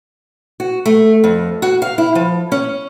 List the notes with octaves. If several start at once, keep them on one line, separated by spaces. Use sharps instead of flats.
F#4
A3
F2
F#4
F5
E4
F3
C#4